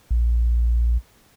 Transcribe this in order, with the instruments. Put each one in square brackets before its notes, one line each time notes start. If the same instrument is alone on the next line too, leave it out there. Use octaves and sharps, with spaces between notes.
[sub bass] A#1